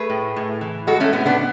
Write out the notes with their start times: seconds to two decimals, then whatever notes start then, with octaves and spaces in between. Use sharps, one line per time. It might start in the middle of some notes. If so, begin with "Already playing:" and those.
Already playing: A3 G#4 B4
0.10 A2
0.36 A2
0.61 E3
0.87 G#3 F#4 A4
1.00 A3 C#4
1.13 A2 B3
1.26 B3 D4